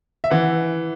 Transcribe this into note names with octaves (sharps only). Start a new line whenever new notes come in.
E5
E3 F#5